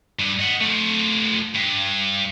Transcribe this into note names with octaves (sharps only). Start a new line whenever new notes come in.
G2
D#5 F#5
A3 F4
G2